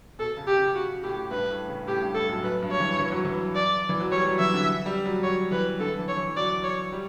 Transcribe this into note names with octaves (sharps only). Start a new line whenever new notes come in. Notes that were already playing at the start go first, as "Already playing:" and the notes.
B2 A4
C#3
G4
C#3
C#3 F#4
A2 G4
G2 B4
A2
C#3
A2 G4
G2
A2 A4
F#2
F#2 B4
G2
C#5
E3
E3
F#3
E3
D5
E3
F#3
G3 C#5
F#3
E3 E5
D3
G3
F#3
F#3 C#5
E3 B4
D3 A4
E3
C#5
E3
F#3 D5
C#5
G3